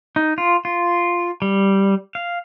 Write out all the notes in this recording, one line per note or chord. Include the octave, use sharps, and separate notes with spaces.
D#4
F4
F4
G3
F5